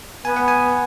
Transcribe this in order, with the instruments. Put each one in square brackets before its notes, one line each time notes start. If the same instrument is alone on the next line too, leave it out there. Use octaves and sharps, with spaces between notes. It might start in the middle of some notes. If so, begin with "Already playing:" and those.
[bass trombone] B3 [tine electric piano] G#5
[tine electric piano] F#5
G#5